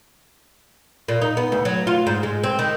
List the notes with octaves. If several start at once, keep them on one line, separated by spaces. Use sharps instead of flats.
A#2
D#4
B3
D2
F#3
F4
G#2
G#3
C4
D#3